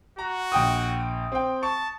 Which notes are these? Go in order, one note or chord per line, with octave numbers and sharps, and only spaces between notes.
F#4 A#5
A#1 G5 D#6
C4 G5
A5 C#6